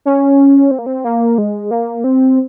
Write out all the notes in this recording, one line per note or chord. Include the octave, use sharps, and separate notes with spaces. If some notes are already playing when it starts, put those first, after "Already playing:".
C#4
C4
A#3
C4
A#3
G#3
A#3
C4